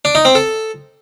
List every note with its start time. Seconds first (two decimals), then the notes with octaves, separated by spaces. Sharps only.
0.05 D4
0.15 D#4
0.25 C4
0.35 A4